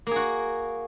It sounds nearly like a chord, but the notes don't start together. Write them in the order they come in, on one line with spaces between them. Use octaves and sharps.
A#3 G#4 F#4